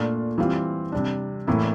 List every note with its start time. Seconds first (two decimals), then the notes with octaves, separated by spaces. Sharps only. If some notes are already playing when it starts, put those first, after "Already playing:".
Already playing: A#2 A3 D4 F4
0.38 E3 G3 C4 F4
0.92 C3 G3 D4
1.47 A2 E3 A#3 E4